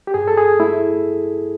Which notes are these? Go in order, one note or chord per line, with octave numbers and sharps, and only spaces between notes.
G4
G2 G#4
A4
G#4
A3 E4